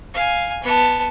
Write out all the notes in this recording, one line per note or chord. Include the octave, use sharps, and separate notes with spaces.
F5 G#5
B3 A5